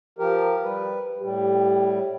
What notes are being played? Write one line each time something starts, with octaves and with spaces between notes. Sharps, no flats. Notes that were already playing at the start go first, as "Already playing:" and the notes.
F3 G4 A#4
G3 B4
A2 G3 G4